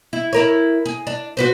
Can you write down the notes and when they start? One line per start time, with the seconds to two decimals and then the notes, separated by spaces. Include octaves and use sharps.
0.13 E4
0.33 E4 A#4 C#5
0.86 G#4
1.07 D4
1.37 F#4 B4 C5